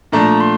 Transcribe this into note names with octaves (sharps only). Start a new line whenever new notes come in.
A#2 F3 A3 D4 A#5
C6